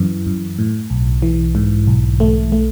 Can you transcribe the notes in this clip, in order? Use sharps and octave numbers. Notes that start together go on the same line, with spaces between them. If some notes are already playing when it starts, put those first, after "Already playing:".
Already playing: F#2 E3
F#2
A2
B1
E3
G#2
B1
A3
A3